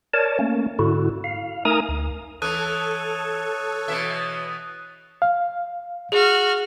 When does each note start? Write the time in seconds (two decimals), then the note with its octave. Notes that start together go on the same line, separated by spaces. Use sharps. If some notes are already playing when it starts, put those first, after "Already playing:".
0.13 A#4 C#5 D5 A5
0.39 A3 A#3 C#4
0.79 G#2 D3 E4 F#4
1.24 F5
1.65 A3 D#4 A#4 G#5 A#5 D#6
1.89 D2
2.42 E3 A4 C#5 D#6 F#6 D#7
3.88 B2 E3 E5
5.22 F5
6.12 F#4 G#4 F6